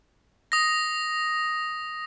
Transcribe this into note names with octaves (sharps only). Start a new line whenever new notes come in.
D#6 A#6